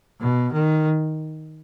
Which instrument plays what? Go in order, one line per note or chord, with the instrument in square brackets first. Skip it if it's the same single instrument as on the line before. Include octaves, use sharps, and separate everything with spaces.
[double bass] B2
D#3